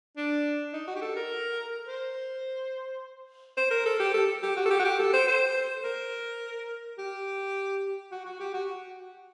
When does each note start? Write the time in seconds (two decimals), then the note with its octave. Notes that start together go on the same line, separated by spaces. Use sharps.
0.17 D4
0.73 D#4
0.88 F#4
0.95 G4
1.02 A4
1.16 A#4
1.87 C5
3.57 C5
3.71 A#4
3.86 A4
4.00 G4
4.14 A4
4.43 G4
4.57 F#4
4.66 A4
4.70 G4
4.79 F#4
4.84 G4
4.99 A4
5.13 C5
5.28 C5
5.84 A#4
6.98 G4
8.12 F#4
8.26 F#4
8.40 G4
8.54 F#4